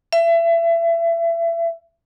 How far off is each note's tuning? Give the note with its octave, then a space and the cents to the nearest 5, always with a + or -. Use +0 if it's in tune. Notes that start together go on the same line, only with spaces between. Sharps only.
E5 +30